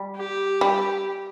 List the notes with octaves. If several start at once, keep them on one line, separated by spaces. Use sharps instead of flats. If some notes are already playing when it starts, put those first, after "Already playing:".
Already playing: G3
G4
G3